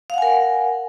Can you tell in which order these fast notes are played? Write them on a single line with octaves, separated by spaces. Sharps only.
F5 F#5 G#5 A#4